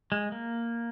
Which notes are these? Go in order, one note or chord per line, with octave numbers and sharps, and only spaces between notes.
G#3
A#3